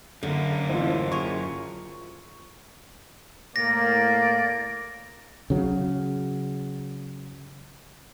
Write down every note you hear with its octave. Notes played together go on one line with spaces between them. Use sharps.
F#2 D3 A#3
A1 E3 E4 F4 C5
G#4 A#4 C#6
A2 A#3 D5 A#6
C#3 F#3